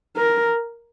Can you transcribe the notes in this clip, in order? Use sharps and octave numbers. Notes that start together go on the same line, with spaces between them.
A#4